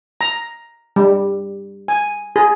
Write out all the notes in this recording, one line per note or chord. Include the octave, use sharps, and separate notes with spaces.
A#5
G3
G#5
G#4